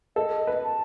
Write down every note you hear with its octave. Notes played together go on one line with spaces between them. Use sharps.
A4 D#5
B4
A5